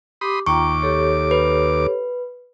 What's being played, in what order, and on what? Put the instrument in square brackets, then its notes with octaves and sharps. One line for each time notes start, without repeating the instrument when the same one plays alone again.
[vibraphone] G4 D6 [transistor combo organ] B5 C6 D#6
[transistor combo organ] D#2 D6 [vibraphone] F4 G5 A#5 [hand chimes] C#6
[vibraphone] G4 A4 C#5
[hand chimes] B4